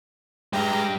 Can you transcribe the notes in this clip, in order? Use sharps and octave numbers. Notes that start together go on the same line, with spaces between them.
G2 G#3 G4 A#5